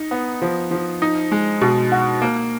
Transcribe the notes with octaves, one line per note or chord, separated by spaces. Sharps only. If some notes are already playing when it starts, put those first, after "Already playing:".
Already playing: D#4
B3
F3
F3
D#4
G#3
B2
F#4
A#3